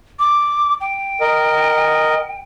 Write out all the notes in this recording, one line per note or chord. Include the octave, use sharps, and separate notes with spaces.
D6
G5
A#4 D#5